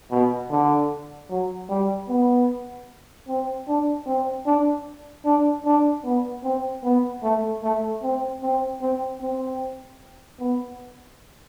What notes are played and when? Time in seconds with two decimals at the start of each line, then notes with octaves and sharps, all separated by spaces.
0.11 B2
0.50 D3
1.30 F#3
1.69 G3
2.09 B3
3.28 C4
3.68 D4
4.06 C4
4.46 D4
5.25 D4
5.65 D4
6.04 B3
6.44 C4
6.84 B3
7.23 A3
7.63 A3
8.02 C4
8.42 C4
8.82 C4
9.21 C4
10.39 B3